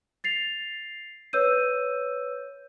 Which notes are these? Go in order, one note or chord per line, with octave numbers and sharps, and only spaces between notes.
A6 C7 F7
B4 C#5 E6 G6 D#7